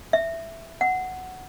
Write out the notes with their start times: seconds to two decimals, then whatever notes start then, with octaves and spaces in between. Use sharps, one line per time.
0.13 E5
0.81 F#5